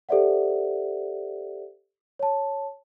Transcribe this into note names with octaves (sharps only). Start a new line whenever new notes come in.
G4 A4 C5 D5 E5 F#5
C#5 A5